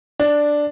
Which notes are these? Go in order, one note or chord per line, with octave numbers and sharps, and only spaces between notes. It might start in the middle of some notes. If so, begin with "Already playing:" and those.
D4